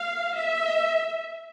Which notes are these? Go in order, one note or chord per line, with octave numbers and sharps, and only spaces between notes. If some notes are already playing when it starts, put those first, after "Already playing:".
Already playing: F5
E5